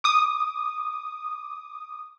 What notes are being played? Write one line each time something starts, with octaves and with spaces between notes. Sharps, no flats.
D6 D#6